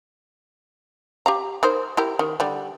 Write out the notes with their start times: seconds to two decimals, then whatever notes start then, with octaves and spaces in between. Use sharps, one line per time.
1.26 G4 F5 A#5
1.63 D#4 A#4 C5
1.97 E4 G4 A#4
2.19 D#3
2.40 D3 G3